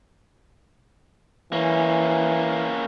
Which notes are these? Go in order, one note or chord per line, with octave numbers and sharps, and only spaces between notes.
E3 A#3 C#4